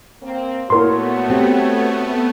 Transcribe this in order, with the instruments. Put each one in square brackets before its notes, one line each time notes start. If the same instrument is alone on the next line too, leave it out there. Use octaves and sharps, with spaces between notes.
[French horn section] A#3 C4
[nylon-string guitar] A#2 [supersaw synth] A3 B3 [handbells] E4 A#4 C6 [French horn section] F#4 C#5
[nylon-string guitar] C4 G4